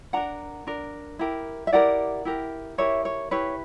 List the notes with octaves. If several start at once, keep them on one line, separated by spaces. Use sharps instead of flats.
D4 A#4 F#5 A#5
D4 A#4
E4 G4 A#4
E5
E4 G4 A#4 D5 F#5
E4 G4 A#4
E4 G4 A#4 C#5 E5
C#5
E4 G4 B4 C#5